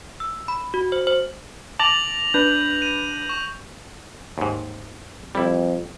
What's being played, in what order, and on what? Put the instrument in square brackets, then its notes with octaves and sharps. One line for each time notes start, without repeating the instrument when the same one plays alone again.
[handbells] E6
B5
F#4
C5
C5
[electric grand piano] A5 D6 A6 [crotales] A#6 F7 F#7
[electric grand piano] D4 B4 [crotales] G6
[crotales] D#7
C#6
[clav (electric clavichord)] D#2 G#2
[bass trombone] F2 [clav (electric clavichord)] G3 E4